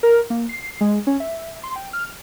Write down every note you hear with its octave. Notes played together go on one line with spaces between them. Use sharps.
A#4
A#3
C7
G#3
C#4
E5
C6
G5
F6